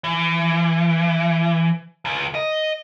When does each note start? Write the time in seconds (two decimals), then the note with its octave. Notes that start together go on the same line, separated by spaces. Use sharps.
0.04 E3
2.05 C#2
2.35 D#5